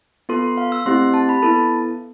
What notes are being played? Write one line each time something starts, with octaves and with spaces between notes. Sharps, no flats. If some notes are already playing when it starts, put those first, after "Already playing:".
B3 F4 A4 C6
C6
F5
E6
A3 C4 E4 G4 C6
A5
B5
B3 E4 A4 A5